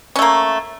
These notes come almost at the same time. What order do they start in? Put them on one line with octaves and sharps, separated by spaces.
C#4 A3 A#3